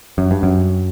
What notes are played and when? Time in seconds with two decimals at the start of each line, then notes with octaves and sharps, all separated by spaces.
0.18 F#2
0.31 G2
0.43 F#2